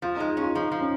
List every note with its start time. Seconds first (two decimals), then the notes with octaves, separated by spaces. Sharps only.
0.02 F3 F4
0.16 G#3 D#4
0.29 G#4
0.37 C#4
0.42 F4
0.55 F3 D#4
0.72 F3
0.81 C#4